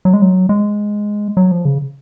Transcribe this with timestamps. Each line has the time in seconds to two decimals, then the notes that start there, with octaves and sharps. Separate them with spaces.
0.05 F#3
0.14 G#3
0.22 F#3
0.49 G#3
1.37 F#3
1.52 F3
1.65 C#3